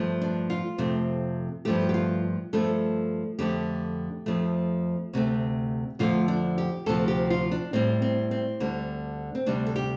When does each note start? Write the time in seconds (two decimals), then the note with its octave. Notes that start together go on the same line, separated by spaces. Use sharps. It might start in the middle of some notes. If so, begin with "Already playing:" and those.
Already playing: G2 F3 A3
0.21 D4
0.50 F4
0.78 F2 C3 A3
1.65 G2 F3 A3 G4
1.89 G4
1.94 F4
2.53 G2 F3 A3 A4
3.39 F2 D3 A3 G4
4.26 F2 F3 A3
5.13 D2 C3 A3
5.99 F2 D3 F3 A3 F4
6.28 D4
6.58 G4
6.86 D2 C3 F3 A4
7.08 G4
7.30 F4
7.51 D4
7.73 A2 G3 C4
8.02 C4
8.31 C4
8.60 D2 D3 G3
9.35 C4
9.46 D2 C3 G3 D4
9.66 A4
9.76 G4